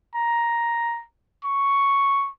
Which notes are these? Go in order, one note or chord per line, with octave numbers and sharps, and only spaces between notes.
A#5
C#6